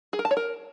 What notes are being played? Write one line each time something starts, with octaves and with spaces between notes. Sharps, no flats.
G#4
A#4
A5
C#5
A#4